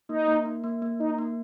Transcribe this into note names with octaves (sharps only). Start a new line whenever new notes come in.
A#3 D#4
A#3
A#3
A#3
A#3
A#3 D#4
A#3